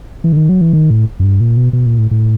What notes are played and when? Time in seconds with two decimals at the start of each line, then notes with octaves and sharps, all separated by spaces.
0.24 E3
0.32 D3
0.37 D#3
0.49 F#3
0.61 E3
0.73 D#3
0.90 A2
1.20 F#2
1.24 G2
1.41 A#2
1.57 B2
1.73 B2
1.86 A#2
1.99 A2
2.11 A2